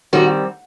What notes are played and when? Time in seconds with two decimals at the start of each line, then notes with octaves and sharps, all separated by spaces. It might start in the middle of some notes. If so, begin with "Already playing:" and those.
0.13 D#3 G3 C4 F#4